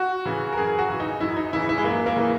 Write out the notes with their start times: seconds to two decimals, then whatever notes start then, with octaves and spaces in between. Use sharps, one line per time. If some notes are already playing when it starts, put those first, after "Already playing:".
Already playing: F#4
0.25 C#3 E3
0.53 A#4
0.57 F#2 G#4
0.79 F#4
0.90 C#3 E3
1.00 D#4
1.20 F#2 E4
1.36 D#4
1.53 C#3 E3 E4
1.69 E4
1.78 G#3
1.84 F#2 A#3
2.06 A#3
2.16 C#3 E3